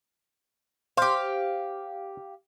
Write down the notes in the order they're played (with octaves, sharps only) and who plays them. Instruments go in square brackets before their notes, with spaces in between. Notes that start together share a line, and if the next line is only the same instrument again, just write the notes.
[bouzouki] G4 F5 [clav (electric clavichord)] C5